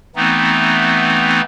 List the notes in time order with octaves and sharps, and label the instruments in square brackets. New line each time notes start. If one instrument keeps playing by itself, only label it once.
[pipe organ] E3 A3 B3 C4 D#4